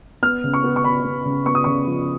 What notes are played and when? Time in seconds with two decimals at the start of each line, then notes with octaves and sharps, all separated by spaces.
0.22 B3 F6
0.44 C#3
0.53 C#6
0.64 B3
0.76 C#6
0.84 B3 B5
1.05 B3
1.25 C#3
1.46 B3 C#6
1.55 D#6
1.64 C#3 C#6
1.87 F3